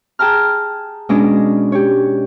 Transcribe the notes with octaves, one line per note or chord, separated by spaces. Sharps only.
G#4 G5 A5 A#5 F6
B2 G#3 C#4 D4 D#5 D6
G4 C#5